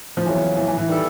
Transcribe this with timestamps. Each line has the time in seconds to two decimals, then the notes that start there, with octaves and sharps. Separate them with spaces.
0.17 F3
0.26 F2 C#3 E3 F#3 B3
0.57 E3
0.68 E3
0.78 E3
0.88 D#3 E3 G3 B3 E4 A4